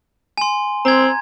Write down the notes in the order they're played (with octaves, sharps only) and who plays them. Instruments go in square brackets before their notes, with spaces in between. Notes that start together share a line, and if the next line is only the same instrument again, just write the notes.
[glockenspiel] G#5 C6
[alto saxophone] C4 [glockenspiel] A#5 G#6